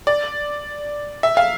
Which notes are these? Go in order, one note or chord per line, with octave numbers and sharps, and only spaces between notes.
D5
E5
F5